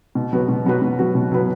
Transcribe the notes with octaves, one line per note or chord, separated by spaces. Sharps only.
B2
F#3 B3 F#4 B4
B2
F#3 B3 F#4 B4
B2
F#3 B3 F#4 B4
B2
F#3 B3 F#4 B4